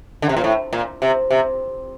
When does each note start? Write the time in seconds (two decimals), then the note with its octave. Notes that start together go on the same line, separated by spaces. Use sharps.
0.22 D3
0.29 C3
0.37 A#2
0.44 A2
0.73 A#2
1.02 C3
1.31 C3